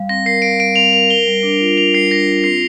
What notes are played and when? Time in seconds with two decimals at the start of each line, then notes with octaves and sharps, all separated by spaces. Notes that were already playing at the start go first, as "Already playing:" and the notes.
Already playing: G3 F5
0.09 C4 A#6
0.25 A#4 C7
0.42 F5 D7
0.59 G3 D7
0.76 C4 F7
0.92 A#4 F7
1.10 A#4 G7
1.27 G3
1.43 D4
1.60 F4
1.77 A#4 F7
1.94 G3 C7
2.11 D4 A#6
2.27 F4
2.44 C4 C7